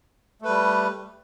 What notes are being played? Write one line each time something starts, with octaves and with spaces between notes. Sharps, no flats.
G3 A3 B4